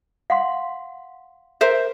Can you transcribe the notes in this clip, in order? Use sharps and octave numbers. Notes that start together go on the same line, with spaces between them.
F5 F#5 C6
A#4 C5 E5